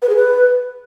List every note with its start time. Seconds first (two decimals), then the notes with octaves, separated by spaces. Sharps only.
0.02 B4
0.09 G#4
0.16 B4